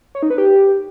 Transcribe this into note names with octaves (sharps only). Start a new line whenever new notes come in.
C#5
D#4
B4
G4